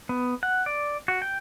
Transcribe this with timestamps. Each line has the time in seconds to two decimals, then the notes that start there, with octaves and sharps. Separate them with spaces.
0.09 B3
0.43 F#5
0.66 D5
1.08 F#4
1.22 G5